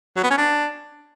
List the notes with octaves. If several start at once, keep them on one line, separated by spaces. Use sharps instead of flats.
F#3
B3
C#4
D4